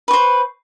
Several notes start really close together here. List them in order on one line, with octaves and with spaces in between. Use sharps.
B4 C#6 C5